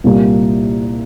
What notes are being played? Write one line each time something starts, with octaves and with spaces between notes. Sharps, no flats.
C2 A#2 G3 A#3